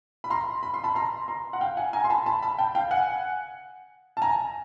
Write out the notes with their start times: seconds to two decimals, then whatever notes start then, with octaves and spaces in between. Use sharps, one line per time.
0.24 B5
0.30 A#5 C6
0.63 B5
0.74 C6
0.84 A5 B5
0.95 A#5 C6
1.28 A#5 C6
1.53 F#5
1.61 F5 G5
1.77 F#5 G#5
1.93 G#5 A#5
2.04 C6
2.10 A5 B5
2.26 A5 B5
2.42 A5 B5
2.58 G5 A5
2.75 F5 G5
2.91 F#5 G#5
4.17 A5
4.22 G#5 A#5